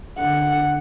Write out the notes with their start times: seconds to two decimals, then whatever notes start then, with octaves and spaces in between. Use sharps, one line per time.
0.19 D3 F#5